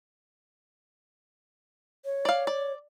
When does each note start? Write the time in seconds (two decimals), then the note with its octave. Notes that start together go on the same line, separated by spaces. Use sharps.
2.05 C#5
2.25 D5 F5
2.47 D5